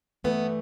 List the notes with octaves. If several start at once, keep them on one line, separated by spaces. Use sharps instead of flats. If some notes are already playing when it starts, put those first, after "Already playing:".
G2 E3 A3 B3